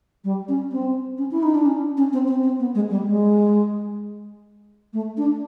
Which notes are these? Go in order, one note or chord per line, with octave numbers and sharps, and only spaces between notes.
G3
C#4
C4
C#4
E4
D#4
D4
C#4
C#4
C4
C4
C4
B3
G#3
G3
G#3
A3
D4